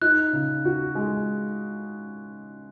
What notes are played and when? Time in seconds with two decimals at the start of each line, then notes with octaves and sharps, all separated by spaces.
0.01 D#4 F#6
0.33 C#3
0.65 F#4
0.95 G#3